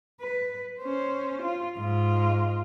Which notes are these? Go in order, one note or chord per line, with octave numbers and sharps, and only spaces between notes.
B4
C#4 C5
F4
G#2 F4